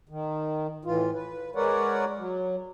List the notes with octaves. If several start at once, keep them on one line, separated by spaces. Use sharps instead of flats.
D#3
A2 E3 F4
B4
G#3 A#4 B4 C#5 D5 F#5
F#3